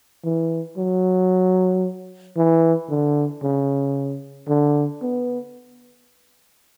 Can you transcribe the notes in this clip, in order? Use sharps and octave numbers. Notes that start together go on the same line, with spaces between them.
E3
F#3
E3
D3
C#3
D3
B3